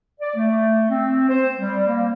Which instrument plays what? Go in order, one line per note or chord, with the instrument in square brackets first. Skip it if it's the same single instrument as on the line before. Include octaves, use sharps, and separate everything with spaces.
[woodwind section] D5
A3
C4
C5
G3
A#3